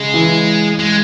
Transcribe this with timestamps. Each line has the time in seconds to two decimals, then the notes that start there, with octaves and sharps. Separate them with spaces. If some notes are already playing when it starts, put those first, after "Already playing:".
Already playing: C#3 G#3
0.14 E3
0.79 G#3